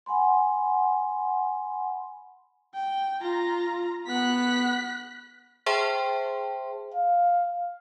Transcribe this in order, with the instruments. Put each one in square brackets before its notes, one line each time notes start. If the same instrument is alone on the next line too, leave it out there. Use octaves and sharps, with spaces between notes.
[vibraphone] F#5 G#5 B5 C6
[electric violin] G5
F4 A#5
[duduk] B3 [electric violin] F#6 B6
[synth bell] G#4 C5 E5 G5 A5 C6
[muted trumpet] F5